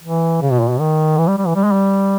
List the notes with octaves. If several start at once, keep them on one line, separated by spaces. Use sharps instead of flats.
E3
C#3
B2
A#2
B2
D#3
E3
G3
G3
E3
G3
G#3
G3